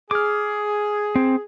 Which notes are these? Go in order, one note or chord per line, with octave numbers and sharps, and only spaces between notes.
G#4 D6 F6
C4